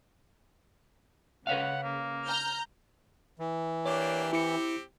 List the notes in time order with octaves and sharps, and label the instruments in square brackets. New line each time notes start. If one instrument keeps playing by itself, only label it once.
[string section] C#3 [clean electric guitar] B4 C#5 F5 [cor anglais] F#5
[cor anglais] A#3
[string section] A#5 F6 G6
[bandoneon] E3
[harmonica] A#3 D4 G4 [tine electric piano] C#5
[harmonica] C4 G4 [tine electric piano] E4 C#7